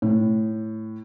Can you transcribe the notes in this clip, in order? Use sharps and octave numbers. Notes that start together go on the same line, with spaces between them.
A2